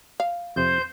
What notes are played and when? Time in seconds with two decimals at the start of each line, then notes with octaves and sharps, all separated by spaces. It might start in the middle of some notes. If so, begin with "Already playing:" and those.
0.20 F5
0.56 F2 C3 C5 G6